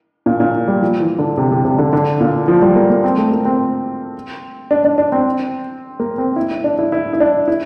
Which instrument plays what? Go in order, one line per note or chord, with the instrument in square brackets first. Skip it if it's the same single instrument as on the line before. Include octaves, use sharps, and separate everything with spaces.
[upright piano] A#2
A#2
G3
F3
E3
D3
C3
C3
C3
D3
D3
A#2
F3
G3
A#3
A#3
C4
A3
A#3
C4
D4
D4
D4
C4
A#3
C4
E4
E4
D4
E4
E4
E4
D4
E4